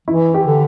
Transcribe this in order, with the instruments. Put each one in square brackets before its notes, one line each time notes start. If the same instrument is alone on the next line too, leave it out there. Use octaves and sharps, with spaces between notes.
[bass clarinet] E3 [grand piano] E4
[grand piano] G4
[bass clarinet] D3